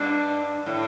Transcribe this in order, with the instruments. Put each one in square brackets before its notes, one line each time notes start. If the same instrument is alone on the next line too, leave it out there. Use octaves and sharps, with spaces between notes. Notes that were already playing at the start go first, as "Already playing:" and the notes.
Already playing: [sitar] G2 [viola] D4
[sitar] A2